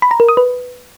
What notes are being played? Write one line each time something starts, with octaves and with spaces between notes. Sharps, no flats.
B5
A#5
A#4
D#6
B4